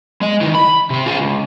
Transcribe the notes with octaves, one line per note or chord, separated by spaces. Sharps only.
G#3 D#5
D#3 E3
B5
C3 C4
F4 G#4
C#2